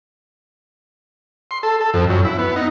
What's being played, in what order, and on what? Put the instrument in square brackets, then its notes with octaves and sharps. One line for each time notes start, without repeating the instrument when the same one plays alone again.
[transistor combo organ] C6
A4
A4
F2
F#2
E4
B3
D#4